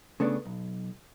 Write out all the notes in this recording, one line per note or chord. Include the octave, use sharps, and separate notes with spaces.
C#3 A3 B3 D4
B1